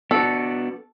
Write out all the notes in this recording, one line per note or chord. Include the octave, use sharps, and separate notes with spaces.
B3 D4 F#4 A4